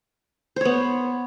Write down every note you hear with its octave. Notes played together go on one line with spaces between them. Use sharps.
B3 C5 C#5